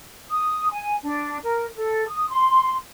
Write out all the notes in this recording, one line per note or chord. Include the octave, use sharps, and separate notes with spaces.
D#6
G#5
D4
A#4
A4
D#6
C6